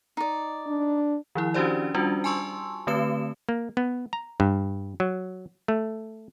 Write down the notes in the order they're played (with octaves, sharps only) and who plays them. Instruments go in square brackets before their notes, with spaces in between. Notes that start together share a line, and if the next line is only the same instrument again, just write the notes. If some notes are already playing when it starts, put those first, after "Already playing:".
[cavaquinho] D#4 D5
[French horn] D4
[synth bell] D#3 F3 E4
C#4 D4 F#4 G4 C5 D5
G3 C#4 D4 F4 F#4
G#5 A5 C6 C#6 E6
D3 A3 C4 B4 E7
[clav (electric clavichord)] A#3
B3
A#5
G2
F#3
A3